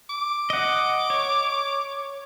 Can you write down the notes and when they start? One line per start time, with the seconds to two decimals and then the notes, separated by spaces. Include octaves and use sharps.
0.10 D6
0.50 D#5 F#5
1.10 C#5